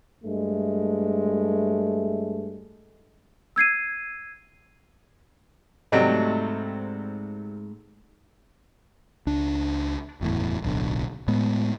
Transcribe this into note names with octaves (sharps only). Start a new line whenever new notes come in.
G2 G#3 A3
E6 G#6 C7 D#7
G#2 C3 F#3 G3 A3 C4 D#5 G#5
C#2 D4
F#1 E2 A2
D1 B1 D3
A2 G#3 B3